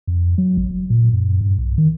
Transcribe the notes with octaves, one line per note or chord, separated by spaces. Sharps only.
F2
F#3
A1
F1
A#2
F#2
G2
B1
D#3